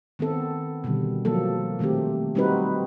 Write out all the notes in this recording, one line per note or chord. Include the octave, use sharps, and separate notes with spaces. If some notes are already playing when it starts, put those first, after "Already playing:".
D#3 B3 C4 A4
B2 D3 D#3 G3
F3 F#3 A#3 A4
A#2 D#3 A3 C4 G4
G3 C4 D#4 F#4 B4